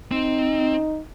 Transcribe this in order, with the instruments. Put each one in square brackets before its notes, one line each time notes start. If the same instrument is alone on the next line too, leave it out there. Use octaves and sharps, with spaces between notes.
[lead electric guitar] C4 [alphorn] D#4